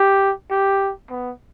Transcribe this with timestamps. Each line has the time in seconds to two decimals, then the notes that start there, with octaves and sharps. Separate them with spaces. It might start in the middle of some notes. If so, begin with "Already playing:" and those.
Already playing: G4
0.50 G4
1.10 B3